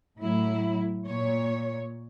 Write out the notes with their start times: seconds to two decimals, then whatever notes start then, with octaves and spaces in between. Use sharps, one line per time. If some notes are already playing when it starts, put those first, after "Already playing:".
0.21 A2 F#3 E4
1.06 A#2 C#5